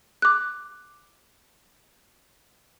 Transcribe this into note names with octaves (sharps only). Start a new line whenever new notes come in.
D6 F#6